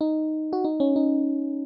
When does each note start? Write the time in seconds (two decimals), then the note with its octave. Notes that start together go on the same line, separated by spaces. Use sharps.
0.01 D#4
0.53 F#4
0.64 D#4
0.80 C#4
0.96 D#4